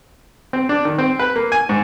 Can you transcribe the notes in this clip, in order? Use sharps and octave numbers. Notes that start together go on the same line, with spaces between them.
C4
D4
D#3
C4
B4
A#3
G#5
G#2